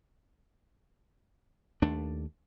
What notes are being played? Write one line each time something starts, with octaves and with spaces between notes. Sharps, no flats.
D#2 A3 D4